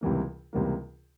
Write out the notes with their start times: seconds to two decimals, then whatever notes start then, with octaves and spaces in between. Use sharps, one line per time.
0.01 C#2 C3 E3 G3 A#3
0.53 C#2 C3 E3 G3 A#3